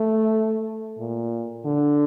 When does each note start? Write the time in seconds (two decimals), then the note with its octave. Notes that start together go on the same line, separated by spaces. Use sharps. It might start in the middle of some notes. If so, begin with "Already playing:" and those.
Already playing: A3
0.98 A#2
1.65 D3